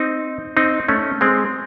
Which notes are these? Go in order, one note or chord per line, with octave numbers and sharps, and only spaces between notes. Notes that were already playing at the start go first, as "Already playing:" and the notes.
Already playing: C4 D#4
C4 D#4
A3 C#4
G#3 C4